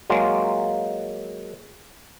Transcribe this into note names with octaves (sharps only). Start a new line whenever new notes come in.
F#3 G#3 A#3 F4